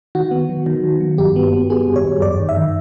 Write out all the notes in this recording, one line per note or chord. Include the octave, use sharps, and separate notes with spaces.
D#3 F#4
B3
F#3
D#3
D#3
F#3
G2 G4
B3
B3
B3 G#4
G2
C#5
G2
F#2 D5
D#3
E5
D#3